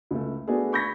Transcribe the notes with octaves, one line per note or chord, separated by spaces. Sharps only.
C#2 A3
A3 B3 D4 F#4 G#4
B5 C#6 G6 G#6 A#6 B6